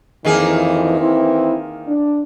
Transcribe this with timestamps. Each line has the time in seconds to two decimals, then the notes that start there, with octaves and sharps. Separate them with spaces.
0.25 F2 D#3 E3 A#3 G#4
0.99 E3 C4 E4
1.87 D4